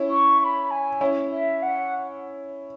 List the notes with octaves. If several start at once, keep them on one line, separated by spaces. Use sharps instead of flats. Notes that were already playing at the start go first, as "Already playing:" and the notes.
Already playing: C#4 E4
C#6
C#6
B5
G#5
C#4 E4
E5
F#5